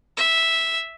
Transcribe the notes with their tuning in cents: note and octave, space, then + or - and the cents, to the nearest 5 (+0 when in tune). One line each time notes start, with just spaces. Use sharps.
E5 -5